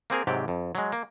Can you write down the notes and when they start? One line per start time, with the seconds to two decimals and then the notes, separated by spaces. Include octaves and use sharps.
0.10 A#3 C4 G#4 A#4
0.27 G#2 C3 F#3 G4 D5
0.48 F2
0.75 F#3 G#3
0.92 A#3